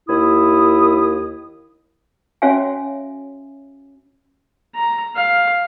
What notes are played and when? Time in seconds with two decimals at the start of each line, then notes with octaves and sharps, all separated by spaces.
0.09 D#2 E4 D#6
2.42 C#4 F#4 C#5 E5 F5 G#5
4.75 A#5
5.16 F5